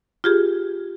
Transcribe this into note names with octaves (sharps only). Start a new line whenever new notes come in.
F4 G4 G#4